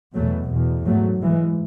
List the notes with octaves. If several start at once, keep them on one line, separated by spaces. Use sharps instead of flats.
E2 B2 F#3 A3
E2 B2
G#2 F#3 A3
G#2 E3 G#3